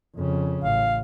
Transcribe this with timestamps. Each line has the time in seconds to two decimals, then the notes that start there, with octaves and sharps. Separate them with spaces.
0.16 F2 C#3
0.64 A1 F5